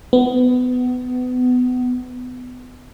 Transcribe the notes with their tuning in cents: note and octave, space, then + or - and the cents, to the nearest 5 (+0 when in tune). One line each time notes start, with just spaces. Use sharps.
B3 +25